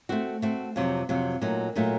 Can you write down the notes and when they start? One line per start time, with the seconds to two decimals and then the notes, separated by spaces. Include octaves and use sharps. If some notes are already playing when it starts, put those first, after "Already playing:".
0.09 A3 C4 F#4
0.42 A3 C4 F#4
0.76 F2 C3 F#3
1.09 F2 C3 F#3
1.41 A#2 F#3 A3 D#4
1.75 A#2 F#3 A3 D#4